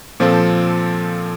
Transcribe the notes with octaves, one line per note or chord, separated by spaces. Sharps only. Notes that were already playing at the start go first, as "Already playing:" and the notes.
A#2 F3 C4 F4 A4